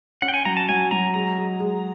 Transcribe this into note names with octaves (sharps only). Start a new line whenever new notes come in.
C#4 F#5
G5
G#5
F#3 A#5
A5
F#3 G#5
F#3 A#5
G#3 A#5
G#3
G#3